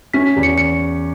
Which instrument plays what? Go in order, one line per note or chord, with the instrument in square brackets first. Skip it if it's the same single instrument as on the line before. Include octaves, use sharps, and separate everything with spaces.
[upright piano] C#4 [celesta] B6
[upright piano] E2
[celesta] C#7
C#7